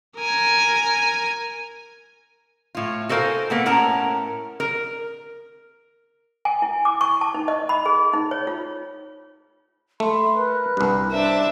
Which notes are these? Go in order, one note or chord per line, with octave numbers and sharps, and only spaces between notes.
A#4 G#5
A2 F4
F#4 A4 A#4 C5 F5 G#5
A#3 B3 A4
A2 C#4 A#4 F#5 A5 A#5
A#4
G#5
E4
D6
C#6
A5
D#4
D#5
B5
G#4
D#4
C#5
F4
A3 B5 C6
A#4 B4 F#6
C2 G2
D4 E4 C5 E5